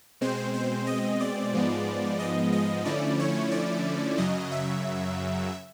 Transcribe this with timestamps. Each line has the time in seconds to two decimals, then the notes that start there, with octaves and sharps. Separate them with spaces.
0.21 B2 G#3 C4 C5
0.54 C5
0.87 D#5
1.21 D5
1.53 G#2 F3 G#3 B3
2.19 D#5
2.53 D#5
2.85 D3 F3 A3 C#4 E4 D5
3.20 C#5
3.51 D5
4.18 F#2 C#3 F#3 D#5
4.52 E5